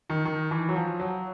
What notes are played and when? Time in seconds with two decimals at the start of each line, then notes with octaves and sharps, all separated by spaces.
0.10 D#3
0.25 D#3
0.51 E3
0.69 F#3
0.76 F3
1.00 F#3